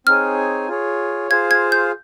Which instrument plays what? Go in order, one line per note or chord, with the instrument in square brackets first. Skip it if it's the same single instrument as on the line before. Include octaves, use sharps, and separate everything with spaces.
[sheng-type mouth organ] C4 D#4 G#4 C#5 G#5 [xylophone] F6
[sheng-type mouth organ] F4 G#4 C#5
[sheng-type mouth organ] F4 G#4 C5 F5 [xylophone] G#6
[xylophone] G#6
G6